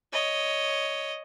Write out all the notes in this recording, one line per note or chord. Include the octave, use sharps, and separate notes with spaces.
C#5 D#5